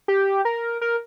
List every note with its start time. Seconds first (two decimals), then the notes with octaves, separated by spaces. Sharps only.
0.08 G4
0.45 A#4
0.81 A#4